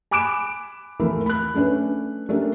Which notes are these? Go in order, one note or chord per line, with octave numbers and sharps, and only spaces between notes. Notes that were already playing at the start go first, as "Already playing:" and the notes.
G#5 B5 D6 F#6 D7 E7
D#2 E3 A3 A#4 B5
B5 F#6
A3 C#4 D4 B4
A3 C#4 D4 G4 A4 A#4